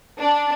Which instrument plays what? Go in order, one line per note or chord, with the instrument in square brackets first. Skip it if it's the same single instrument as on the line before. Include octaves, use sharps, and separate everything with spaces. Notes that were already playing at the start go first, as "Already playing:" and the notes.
[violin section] D4